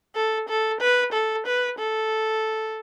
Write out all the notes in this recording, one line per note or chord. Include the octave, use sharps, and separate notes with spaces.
A4
A4
B4
A4
B4
A4